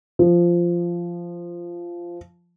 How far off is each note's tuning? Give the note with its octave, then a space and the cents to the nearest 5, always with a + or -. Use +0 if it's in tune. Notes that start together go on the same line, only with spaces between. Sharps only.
F3 -10